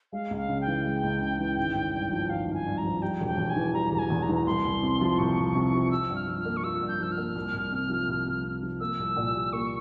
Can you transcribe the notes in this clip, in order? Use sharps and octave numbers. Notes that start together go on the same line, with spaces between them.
G#3 F5
C#2
F5
C#3
G5
E3
G#3
C#2
C#3
E3
G#1
G#1
G2
F3
G#1 F5
G#1
G#5
G2
A#5
F3
G3 G5
E1
G5
E2
G#5
E3
G3 A#5
E1 A#5
G#5
E2
A#5
E3
A#5
C2 C6
C2
C3
F3
C2 C#6
C2
C3
F3
F4 E6
G2
F6
F3
F6
A#3
C#6
F4 E6
G2
G6
F3 E6
F6
A#3
C2
C2
C3
F3
C2
C2
C3
F3
A#3 E6
C2
A#2
G3
A#3 C#6